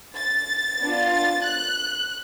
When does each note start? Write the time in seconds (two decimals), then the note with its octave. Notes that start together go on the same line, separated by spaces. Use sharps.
0.16 A6
0.80 B3 D4 F4
1.12 A6
1.44 F#6